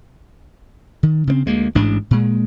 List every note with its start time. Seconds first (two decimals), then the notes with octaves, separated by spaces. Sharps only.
1.03 D#3
1.27 C#3 A#3 C4
1.46 D2 G#3 A#3
1.75 A1 G#2 D4
2.11 A#2 G#3